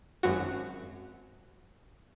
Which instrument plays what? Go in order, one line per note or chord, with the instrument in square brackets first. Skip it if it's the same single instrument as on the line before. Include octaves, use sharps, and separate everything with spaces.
[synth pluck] G#1 F#2 F#4